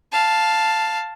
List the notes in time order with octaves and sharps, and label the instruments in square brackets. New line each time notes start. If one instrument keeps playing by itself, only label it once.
[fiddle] F5 A5